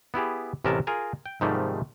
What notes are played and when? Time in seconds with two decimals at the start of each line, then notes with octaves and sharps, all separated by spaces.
0.14 B3 E4 G4 G#4
0.64 A1 C3 B3 C#4 A#4 A5
0.87 F4 G#4 A#4 G#5 A#5
1.26 G5
1.41 G#2 C3 D#3 F3 G3 A3